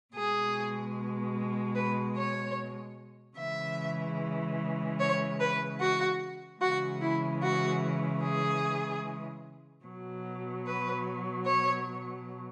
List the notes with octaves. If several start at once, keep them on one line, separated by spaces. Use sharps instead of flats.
B2 G#3 G#4
B4
C#5
C#3 E3 G#3 E5
C#5
B4
F#4
C#3 E3 G#3 F#4
E4
F#4
G#4
B2 F#3
B4
C#5